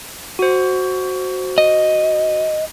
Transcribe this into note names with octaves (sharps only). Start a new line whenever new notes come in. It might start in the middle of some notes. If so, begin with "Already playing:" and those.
F#4 C5
D#5